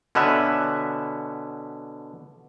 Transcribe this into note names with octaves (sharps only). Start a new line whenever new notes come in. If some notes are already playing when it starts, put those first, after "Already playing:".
B2 D3 C#4 B4 E5